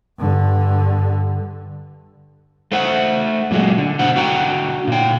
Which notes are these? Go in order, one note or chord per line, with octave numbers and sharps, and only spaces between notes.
G2 D3
A3 C5 F#5
A#2 F#3 G#3
D3
B2 C5 F#5
D3 F#4 F#5 G5 A#5
A#2 G5